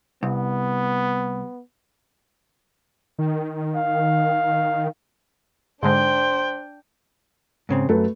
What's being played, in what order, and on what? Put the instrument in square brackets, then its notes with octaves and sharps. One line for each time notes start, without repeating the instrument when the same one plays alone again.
[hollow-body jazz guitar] C2 [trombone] B3
[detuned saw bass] D#3
[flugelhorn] F5
[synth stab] G#2 D3 G#3 [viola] D4 G5 [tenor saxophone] C5
[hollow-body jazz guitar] G#2 C#3 C4
[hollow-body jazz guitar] F#2 [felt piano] A3 A4 B4